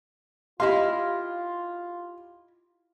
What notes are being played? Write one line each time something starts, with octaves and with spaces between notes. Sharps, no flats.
E4 F4 G4 D#5 F5 C6